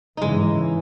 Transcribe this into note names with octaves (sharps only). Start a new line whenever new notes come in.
G#2 C#3 E3 G#3 D#4